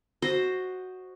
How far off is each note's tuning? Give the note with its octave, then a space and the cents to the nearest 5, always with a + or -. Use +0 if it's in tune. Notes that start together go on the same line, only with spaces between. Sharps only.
F#4 +0 C5 +5 D#5 -10